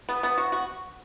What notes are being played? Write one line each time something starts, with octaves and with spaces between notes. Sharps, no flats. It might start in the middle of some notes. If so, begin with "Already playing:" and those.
B3
B3
F#4
F#4